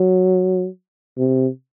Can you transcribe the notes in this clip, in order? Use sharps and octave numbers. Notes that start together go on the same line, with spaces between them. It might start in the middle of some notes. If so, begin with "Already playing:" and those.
Already playing: F#3
C3